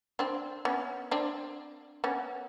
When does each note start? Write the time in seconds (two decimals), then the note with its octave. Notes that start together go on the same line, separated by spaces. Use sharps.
0.19 C4 D4
0.65 B3 C#4
1.11 C4 D4
2.04 B3 C#4